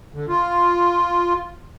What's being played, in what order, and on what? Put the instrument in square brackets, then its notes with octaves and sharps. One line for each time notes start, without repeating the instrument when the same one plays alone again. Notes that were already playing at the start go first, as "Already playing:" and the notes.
[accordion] D3
F4